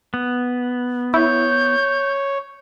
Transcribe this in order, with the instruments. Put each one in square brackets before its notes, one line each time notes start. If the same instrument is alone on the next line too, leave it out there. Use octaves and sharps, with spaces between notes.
[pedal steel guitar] B3
[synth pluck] E4 [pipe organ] C#5 [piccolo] G6